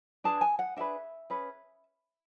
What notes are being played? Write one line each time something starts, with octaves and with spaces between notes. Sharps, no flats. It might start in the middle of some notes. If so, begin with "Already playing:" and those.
D4 G#4 B4 A5
G#5
F#5
D4 G#4 B4 E5
C#4 G#4 B4